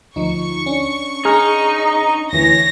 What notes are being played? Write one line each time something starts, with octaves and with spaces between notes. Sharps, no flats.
D2 F3 D#4 C#6
C#4 D4
D#4 G#4 A#5 F6
D2 E3 C#5 A#6